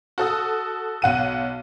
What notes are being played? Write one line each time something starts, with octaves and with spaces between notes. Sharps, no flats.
F#4 A4 D#6
B1 F#5 D#7